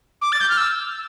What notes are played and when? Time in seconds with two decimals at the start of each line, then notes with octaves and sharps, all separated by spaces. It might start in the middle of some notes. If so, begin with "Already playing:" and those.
0.22 D6
0.32 A6
0.41 G6
0.49 F6
0.57 E6